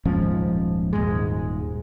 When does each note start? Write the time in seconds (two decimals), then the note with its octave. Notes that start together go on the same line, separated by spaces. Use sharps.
0.05 D#1 G#2 F3 C#4
0.93 D#1 D#2 G#2 G#3